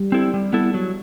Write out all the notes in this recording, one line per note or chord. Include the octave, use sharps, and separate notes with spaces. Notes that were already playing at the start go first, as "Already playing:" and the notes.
Already playing: G3
C4 E4 A4
G3
B3 E4 A4
F#3